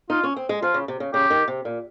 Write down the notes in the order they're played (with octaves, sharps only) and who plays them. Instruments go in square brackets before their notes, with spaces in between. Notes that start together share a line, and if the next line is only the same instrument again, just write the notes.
[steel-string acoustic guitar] D#4 [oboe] F4
[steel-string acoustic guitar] C#4
C4
G#3
[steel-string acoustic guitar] F3 [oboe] F4
[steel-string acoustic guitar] C#3
C3
C#3
[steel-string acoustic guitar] C#3 [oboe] G4
[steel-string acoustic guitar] D#3
C3
A#2